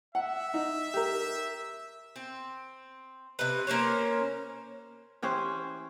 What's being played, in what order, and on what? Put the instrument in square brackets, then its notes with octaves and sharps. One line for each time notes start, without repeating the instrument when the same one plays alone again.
[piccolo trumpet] E5 [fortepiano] F#5
[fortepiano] D#4
G4 A#4
[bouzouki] C4
C3 B4
A#3 C#4 C5 C#5
[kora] E3 C#4 G4 C5